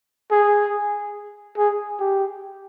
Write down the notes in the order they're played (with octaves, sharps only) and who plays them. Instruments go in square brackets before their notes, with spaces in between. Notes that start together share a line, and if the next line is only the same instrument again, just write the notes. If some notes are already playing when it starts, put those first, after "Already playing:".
[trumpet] G#4
G#4
G4